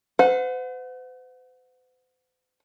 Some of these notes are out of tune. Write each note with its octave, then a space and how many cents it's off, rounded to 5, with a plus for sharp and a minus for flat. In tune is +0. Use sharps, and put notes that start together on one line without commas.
C5 -45 F#5 -25